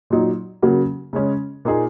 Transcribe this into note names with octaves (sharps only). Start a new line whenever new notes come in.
A#2 F#3 D#4
C#3 F#3 A#3 F#4
C#3 G#3 C#4
A#2 A#3 D#4 G#4